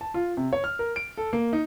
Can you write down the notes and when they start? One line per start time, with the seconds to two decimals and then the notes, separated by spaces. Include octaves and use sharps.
0.01 A5
0.14 F4
0.37 C3
0.53 C#5
0.64 F6
0.79 A#4
0.96 D7
1.18 A4
1.33 A#3
1.53 D#4